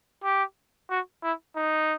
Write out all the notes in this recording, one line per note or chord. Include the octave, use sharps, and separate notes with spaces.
G4
F#4
E4
D#4